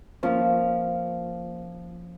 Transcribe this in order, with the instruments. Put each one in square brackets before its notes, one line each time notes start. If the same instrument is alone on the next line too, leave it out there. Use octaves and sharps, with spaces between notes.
[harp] F3 C#4 [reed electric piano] A#3 F4 C5